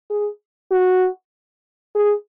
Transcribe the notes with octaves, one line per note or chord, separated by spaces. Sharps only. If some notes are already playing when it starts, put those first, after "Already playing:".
G#4
F#4
G#4